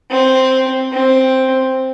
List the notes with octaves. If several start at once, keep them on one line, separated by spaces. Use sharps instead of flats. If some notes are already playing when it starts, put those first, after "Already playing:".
C4
C4